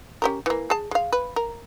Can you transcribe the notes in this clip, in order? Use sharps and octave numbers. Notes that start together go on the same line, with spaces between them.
C#4 G4 A#4
E3 A#3
G#4 A5
G#3 F5
B4
A#4